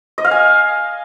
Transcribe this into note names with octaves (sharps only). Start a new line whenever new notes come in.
D#5
F5
G#5